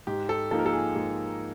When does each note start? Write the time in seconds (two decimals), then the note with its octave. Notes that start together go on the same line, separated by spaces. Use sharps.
0.07 G#2 G4
0.29 A4
0.51 F3 A#3 D#4 A4
0.59 A#4
0.66 A4
0.73 G#4
0.95 G#2 G#4